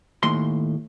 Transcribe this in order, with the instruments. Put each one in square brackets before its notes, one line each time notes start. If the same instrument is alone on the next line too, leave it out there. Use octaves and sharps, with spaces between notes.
[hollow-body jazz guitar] D#2 A2 C6